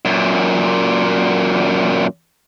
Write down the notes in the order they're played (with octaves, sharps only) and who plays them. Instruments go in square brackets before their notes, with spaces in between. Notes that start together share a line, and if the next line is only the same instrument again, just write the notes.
[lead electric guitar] F#2 A#2